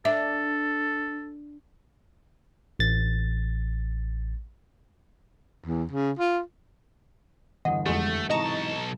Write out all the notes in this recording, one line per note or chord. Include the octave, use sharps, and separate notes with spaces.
D4 A4 E5
A1 A6
E2
C#3
F4
G1 E2 D#5 F#5
F2 G#3 A3 G4 A4
B1 G#2 C3 E3 D#5 A5 A#5 C#6